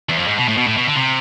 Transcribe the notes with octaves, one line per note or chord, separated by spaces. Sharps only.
E2
F2
G#2
B2
A2
B2
A2
B2
D3
C3